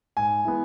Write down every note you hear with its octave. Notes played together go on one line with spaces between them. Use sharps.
G#2 G#5
E3 G#3 B3